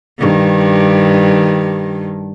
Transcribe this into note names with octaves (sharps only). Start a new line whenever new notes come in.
G2 D#3